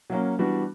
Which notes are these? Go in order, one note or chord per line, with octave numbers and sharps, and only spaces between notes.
F#3 A#3 C#4
E3 G3 B3 D4 F#4